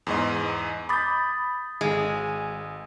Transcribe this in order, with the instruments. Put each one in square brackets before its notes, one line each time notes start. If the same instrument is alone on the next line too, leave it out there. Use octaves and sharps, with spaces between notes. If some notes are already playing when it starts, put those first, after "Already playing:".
[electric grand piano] E2 G#2 D#5
[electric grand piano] B5 G6 [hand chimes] D6 D#6 A6
[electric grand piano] G#1 [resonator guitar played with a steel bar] G#3